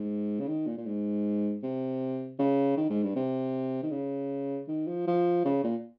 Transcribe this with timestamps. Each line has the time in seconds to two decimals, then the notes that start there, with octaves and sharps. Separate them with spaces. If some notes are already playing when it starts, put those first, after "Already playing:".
Already playing: G#2
0.40 C#3
0.48 D#3
0.67 A#2
0.78 A#2
0.86 G#2
1.63 C3
2.39 C#3
2.77 D#3
2.90 G#2
3.03 G2
3.16 C3
3.83 D#3
3.91 C#3
4.68 D#3
4.87 F3
5.07 F3
5.45 C#3
5.64 A#2